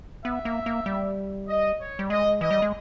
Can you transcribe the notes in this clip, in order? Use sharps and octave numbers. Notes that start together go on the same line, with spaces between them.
B3 E5
A#3
A#3
G3
D#5
C#5
G3
G#3 D#5
E3 D#5
G3
G#3